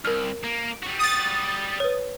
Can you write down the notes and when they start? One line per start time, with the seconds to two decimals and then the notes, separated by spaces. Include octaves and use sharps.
0.05 C2 A#4 F6
0.44 A#3
0.83 G3 F#4
0.99 D#6 A6
1.80 B4 C#5